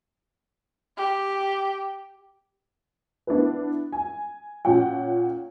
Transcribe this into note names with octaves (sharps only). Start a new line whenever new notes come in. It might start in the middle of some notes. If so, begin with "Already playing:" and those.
G4
B3 D4 E4 B4
G#5
A#2 C#4 F4 F#5 G5